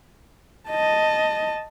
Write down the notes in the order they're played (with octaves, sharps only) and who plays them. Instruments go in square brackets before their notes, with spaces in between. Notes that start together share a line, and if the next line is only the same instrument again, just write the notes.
[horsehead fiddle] D#5 A5